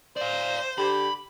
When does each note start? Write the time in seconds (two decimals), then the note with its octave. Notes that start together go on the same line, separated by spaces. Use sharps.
0.17 C5 D5 F5
0.78 D3 G4 B5